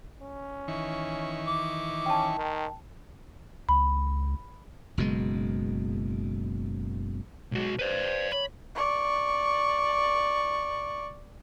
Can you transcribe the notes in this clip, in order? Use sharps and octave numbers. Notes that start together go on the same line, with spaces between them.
C#4
D#3 E3 C#6
D6
C#4 G5 A5
D#3
C#2 B5
F#1 B2 G#3
B1 G#3 F#4
B4 C5 D5
C#5 B5
D5 C#6